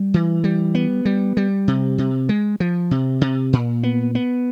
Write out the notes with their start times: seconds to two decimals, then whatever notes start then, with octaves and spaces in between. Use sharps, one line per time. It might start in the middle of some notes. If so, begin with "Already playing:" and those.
Already playing: G3
0.14 E3
0.44 G3
0.75 B3
1.05 G3
1.37 G3
1.68 C3
1.98 C3
2.29 G#3
2.60 F3
2.91 C3
3.21 C3
3.53 A#2
3.83 B3
4.15 B3